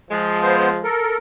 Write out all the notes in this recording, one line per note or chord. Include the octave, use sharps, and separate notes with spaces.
F3 G#3
B3 C5
A4 A#4